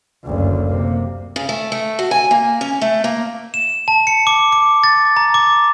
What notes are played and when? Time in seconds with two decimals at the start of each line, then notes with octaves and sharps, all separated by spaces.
0.24 F#1 D2
0.67 C3 A#3
1.36 C#3
1.49 A3
1.72 A3
1.99 F#4
2.11 G#5
2.31 A#3
2.61 C#4
2.81 A3
3.04 A#3
3.54 E7
3.88 A5
4.07 C#7
4.27 D6
4.52 D6
4.84 A6
5.17 A#5
5.34 D6